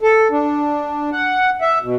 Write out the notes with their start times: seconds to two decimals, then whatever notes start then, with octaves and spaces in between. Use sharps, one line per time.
0.01 A4
0.31 D4
1.13 F#5
1.61 E5
1.82 B2